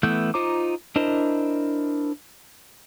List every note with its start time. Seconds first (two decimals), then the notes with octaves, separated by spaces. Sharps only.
0.03 E3 A3 B3 G6
0.34 D#4 F4 C5 A#5 D6
0.96 D4 E4 A#4 C5 D#5